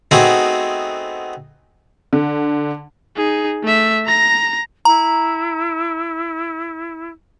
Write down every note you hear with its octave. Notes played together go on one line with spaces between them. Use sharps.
A3 B3 C4 D#4 F#4 G#4
D3
D#4 G#4
A3 E5
A#5 A#6
E4 A#5